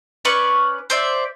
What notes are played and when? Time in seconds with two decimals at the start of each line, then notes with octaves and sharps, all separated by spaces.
0.25 C#4 B4 D5 C#6
0.90 C5 D5 E5